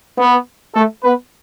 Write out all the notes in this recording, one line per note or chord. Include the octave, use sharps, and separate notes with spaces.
B3
A3 A4
B3 B4